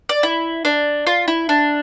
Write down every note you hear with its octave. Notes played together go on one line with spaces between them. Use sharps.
D5
E4
D4
F4
E4
D4